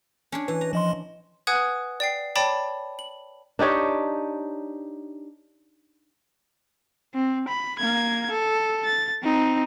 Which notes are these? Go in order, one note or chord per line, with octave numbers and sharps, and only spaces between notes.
C#4 D4 C#5
E3 B4
A#5
F3 D#5 C6
B4 F#5 G#5 D#6 F#6 G#6
D5 G5 C7
C#5 D5 G5 A5 B5 D6
F#7
D4 D#4 G4 C#5
C4
B5
A#3 G#6
A4
A6
C4 D#4